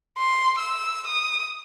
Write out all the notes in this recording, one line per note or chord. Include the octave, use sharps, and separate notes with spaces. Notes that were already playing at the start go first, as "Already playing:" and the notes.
C6
E6
D#6